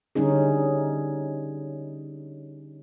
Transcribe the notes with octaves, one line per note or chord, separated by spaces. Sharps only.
D3 G3 C#4 D#4 G#4